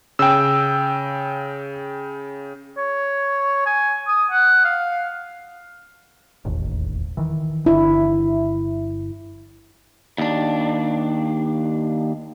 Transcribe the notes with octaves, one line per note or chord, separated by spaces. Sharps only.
C#3 G5 E6
C#5
G#5
D#6
F#5
F5
E1 A1 D#2
D#3 E3
G1 D3 D4 E4
D#2 D4